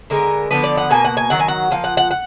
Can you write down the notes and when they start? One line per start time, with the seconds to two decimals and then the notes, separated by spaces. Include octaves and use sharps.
0.10 D3 G#3 B3 A#4
0.51 D3 F3 B3 B4
0.64 D5
0.77 F#5
0.91 B2 A#3 G#5
1.04 F#5
1.17 G#5
1.30 D#3 F#3 F#5
1.40 G#5
1.48 F#5
1.71 A#2 F3 F5
1.84 F#5
1.97 F#5
2.11 F#5